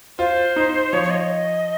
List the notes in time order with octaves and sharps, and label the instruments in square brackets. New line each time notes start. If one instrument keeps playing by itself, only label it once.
[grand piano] F4 [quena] C5
[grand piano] D#4
[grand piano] F3 [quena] C#5
[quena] C#5
D#5